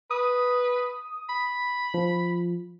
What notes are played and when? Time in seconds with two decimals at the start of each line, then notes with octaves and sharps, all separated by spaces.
0.11 B4 D#6
1.29 B5
1.94 F3